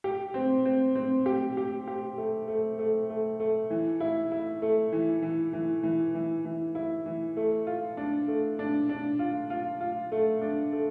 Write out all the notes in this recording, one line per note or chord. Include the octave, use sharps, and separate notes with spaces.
G4
C4
C4
C4
G4
G4
G4
A3
A3
A3
A3
A3
E3
E4
E4
A3
E3
E3
E3
E3
E3
E3
E4
E3
A3
F4
D4
A3
D4
D4
F4
F4
F4
A3
D4
A3